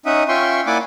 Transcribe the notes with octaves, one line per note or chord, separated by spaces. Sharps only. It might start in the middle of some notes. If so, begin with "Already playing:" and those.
C#4 D#4 E5 F#5 D#6
C#4 F4 E5 G5 C6 C#6
A#3 E4 D5 F#5 G#5 D6